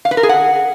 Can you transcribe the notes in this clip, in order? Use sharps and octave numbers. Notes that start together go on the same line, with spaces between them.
F5
B4
A#4
G#4
F#5